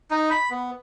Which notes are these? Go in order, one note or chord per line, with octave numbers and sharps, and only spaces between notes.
D#4
B5
B3